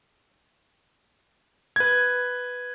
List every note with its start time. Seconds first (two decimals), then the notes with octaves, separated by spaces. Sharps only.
1.76 B4 G#6